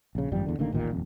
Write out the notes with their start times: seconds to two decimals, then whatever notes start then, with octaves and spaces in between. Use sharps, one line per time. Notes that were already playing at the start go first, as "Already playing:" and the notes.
0.15 A#1 C#3
0.32 G#1 F#2 F3 G3
0.46 E2 D3
0.59 A1 D3 D#3 A#3
0.72 A1 D#2 A#2 D#3
0.91 D#1 F2